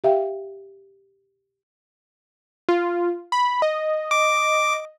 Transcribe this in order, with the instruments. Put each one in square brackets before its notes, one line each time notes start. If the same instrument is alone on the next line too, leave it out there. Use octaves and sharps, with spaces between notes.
[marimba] G4 E5 F5 G5
[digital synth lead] F4
B5
D#5
[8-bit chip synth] D6